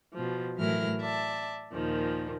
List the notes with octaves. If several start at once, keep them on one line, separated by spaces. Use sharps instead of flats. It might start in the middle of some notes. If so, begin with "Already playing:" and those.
B2 F3
A2 E3 F#3 E4 A#4 F6
D5 E5 A5
D#2 A#2 D#3 F3